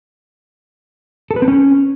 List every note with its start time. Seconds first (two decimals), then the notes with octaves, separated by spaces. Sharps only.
1.31 A4
1.36 B4
1.42 C4
1.48 C#4